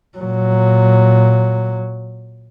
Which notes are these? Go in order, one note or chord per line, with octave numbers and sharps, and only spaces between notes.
A#2 F#3